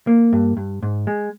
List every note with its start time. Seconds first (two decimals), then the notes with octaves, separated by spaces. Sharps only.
0.07 A#3
0.33 G2
0.57 G2
0.83 G#2
1.07 G#3